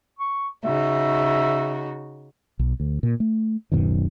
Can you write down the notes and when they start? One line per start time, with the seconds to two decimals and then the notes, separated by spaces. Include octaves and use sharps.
0.19 C#6
0.65 C#3 D#4 F#4 E5
2.59 B1
2.80 D2
3.03 A#2
3.20 A3
3.72 D1 F#2 B2 D#3